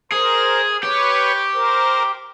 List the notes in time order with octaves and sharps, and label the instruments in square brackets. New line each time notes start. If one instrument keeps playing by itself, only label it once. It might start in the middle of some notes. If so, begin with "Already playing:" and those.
[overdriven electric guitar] G#4 [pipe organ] A#4 C5
[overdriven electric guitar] G4 [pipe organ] B4 C#5
[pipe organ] A#4 C5